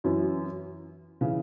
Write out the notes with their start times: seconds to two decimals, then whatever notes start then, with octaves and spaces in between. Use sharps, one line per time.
0.04 F#2 E3 C#4 E4
1.21 C#3 E3